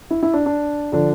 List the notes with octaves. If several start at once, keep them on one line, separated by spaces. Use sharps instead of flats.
E4
E4
D4
D4
D3 F3 D4